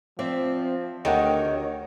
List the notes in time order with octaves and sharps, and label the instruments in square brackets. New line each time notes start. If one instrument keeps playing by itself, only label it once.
[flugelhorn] F3 [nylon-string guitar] C4 D5 E5
[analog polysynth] D2 [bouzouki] D#3 [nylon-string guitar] G4 A#4 F#5 [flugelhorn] C#5